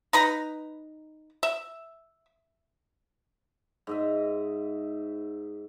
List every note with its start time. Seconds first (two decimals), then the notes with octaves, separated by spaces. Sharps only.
0.13 D#4 B4 A#5
1.43 E5
3.87 G#2 D#5 E5